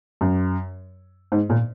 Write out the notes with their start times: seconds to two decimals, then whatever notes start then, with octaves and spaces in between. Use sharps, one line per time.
0.21 F#2
1.32 G#2
1.50 A#2